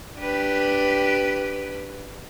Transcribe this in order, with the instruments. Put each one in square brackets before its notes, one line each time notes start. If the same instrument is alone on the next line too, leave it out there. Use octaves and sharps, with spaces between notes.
[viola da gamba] D4 G4 B4